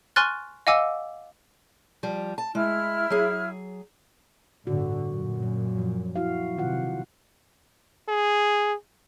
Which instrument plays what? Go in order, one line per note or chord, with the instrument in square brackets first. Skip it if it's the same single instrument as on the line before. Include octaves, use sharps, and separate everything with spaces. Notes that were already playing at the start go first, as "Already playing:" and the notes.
[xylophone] G#5 C6 C#6 F6 F#6 A6
D#5 F5 F#5 G#5 D6 E6
[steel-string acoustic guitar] F3 G3
A5
[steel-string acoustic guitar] G#3 [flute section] E4 F6
[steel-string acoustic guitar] F#3 G#4
[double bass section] G1 A2 D3 [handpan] F#4
[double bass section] F#2 A#2
[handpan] F#3
F3
E4 F#4 F5
[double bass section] C3 [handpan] D#3 F4 F#5
[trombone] G#4